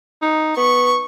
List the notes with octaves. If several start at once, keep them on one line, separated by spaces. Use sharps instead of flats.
D#4
B3 C#6